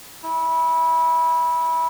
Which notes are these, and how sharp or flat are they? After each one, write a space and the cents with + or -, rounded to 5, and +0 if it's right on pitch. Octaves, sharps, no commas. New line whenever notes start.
E4 -25